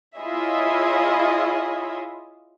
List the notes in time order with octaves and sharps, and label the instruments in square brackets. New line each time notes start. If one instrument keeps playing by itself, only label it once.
[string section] E4 F4 G#4 C#5 D#5 E5